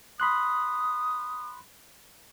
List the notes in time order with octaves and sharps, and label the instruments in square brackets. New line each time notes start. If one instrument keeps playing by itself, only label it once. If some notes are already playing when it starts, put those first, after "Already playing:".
[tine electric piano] B5 C6 F#6 [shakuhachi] D#6